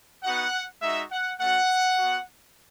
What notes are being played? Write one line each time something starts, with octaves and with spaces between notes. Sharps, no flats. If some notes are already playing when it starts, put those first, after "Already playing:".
B3 D#4 F#4 F#5
G#3 D#4 F#4 E5
F#5
A3 C#4 F#4 F#5
B3 F#4